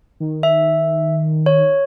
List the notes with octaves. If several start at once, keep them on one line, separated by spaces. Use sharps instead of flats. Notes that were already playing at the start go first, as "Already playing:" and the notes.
D#3
E5
C#5